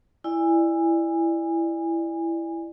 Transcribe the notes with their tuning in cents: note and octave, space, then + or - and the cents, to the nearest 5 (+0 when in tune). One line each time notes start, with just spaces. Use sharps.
E4 +10 D5 +25 G#5 -25